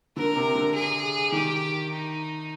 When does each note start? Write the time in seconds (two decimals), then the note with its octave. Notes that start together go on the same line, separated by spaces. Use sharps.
0.16 D3 A#4
0.36 C3
0.55 D3
0.75 G#4
1.32 D#3 G4
1.91 D#4